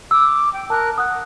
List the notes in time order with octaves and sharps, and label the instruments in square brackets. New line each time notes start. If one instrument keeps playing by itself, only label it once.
[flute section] D6 [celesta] E6
[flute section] G5
[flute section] A#4 F#6 [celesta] A5
[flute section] F#5 [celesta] D#6 F#6